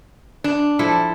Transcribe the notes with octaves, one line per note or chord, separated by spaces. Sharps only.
D4
F3 E4 A4